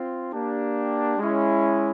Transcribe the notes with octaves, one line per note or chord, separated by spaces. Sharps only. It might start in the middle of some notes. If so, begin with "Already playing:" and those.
Already playing: C4 F4
A#3 D4 G4
G#3 C#4 E4